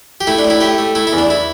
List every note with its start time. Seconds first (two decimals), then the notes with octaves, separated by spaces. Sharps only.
0.21 G4
0.27 A3 E4
0.39 D4
0.45 A2
0.50 E4
0.61 A3 G4
0.78 A3
0.95 A3 E4
1.07 E4
1.13 E2
1.18 D4
1.30 E4